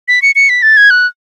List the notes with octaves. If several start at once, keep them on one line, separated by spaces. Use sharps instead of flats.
B6
C#7
C#7
B6
A6
G#6
F#6